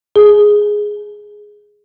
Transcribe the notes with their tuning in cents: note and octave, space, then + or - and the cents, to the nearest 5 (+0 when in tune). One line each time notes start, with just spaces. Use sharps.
G#4 +0 G#5 +40